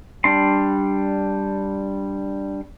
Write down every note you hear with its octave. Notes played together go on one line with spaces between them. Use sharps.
G3 D4 C6